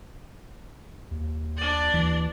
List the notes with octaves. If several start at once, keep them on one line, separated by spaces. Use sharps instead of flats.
D#2
D4 D5
D#2 E3